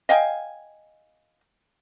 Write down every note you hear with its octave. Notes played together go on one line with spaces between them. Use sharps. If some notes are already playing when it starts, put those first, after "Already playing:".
D#5 F5 G5 G#5